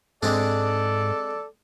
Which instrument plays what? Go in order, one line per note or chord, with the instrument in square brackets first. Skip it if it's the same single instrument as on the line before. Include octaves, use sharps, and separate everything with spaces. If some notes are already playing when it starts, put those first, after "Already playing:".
[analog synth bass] G#2 [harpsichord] G#3 C4 D4 [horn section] A4 D5